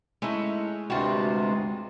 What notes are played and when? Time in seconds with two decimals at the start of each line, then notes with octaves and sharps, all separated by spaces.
0.22 G#3 A3 C#4 D#4 E4
0.90 D2 G2 C3 G3 F4 F#4 F#5